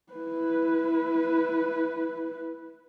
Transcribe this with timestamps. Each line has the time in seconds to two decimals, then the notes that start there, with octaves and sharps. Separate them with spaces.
0.13 E4 B4